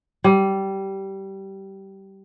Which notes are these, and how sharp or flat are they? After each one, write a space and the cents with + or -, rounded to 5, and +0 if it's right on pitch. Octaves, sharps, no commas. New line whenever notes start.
G3 -15